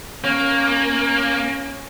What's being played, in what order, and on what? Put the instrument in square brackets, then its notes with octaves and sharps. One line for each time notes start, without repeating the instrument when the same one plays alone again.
[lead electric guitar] A#3 [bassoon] C#4